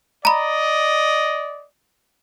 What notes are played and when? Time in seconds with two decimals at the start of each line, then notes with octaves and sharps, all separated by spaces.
0.25 D5 D#5 A#5 B5